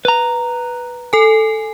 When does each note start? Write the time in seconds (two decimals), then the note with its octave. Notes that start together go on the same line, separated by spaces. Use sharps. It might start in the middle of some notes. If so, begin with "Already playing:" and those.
0.05 B4 A#5
1.13 A4 G#5